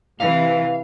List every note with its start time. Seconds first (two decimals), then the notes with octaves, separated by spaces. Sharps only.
0.20 C3 E3 F5